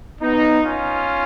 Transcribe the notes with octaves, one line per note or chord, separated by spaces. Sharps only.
B3 D#4
C#4 F4